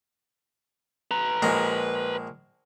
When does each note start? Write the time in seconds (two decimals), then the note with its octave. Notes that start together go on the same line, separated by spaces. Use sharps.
1.11 B4 A#5
1.42 A#1 G#3